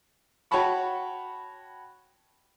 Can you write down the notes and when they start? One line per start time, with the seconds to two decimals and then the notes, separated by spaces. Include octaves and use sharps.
0.51 F#4 C#5 G5 A5 B5 C#6